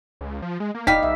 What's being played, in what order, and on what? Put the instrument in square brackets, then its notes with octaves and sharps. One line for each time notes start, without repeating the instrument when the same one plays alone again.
[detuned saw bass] C#2
F3
G#3
A#3
[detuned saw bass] D#1 [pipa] G3 G4 F5 [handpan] D#4 [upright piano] B6
[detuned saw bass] B1 [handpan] E5